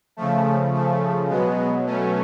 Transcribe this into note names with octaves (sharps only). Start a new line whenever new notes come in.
C#3 F3 A3
A3
B2 F#3 G#3 B3
A3 C#4